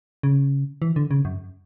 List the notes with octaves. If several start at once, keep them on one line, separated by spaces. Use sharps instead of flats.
C#3
E3
D3
C#3
F#2